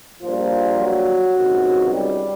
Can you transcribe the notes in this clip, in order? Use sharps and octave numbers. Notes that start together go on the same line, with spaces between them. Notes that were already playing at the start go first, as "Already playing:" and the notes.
A#1 A#2 F3 G3 A#3 F4
F#3 F#4
C#2 C3 D#3 F#3
G3 G4